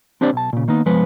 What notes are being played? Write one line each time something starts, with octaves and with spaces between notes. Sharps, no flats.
C4 D4 G4 C5 D5
B1 A5
A#2 C#3
D#3 A#3 B3 D#4
C2 G2 F3 G#3 B3 B4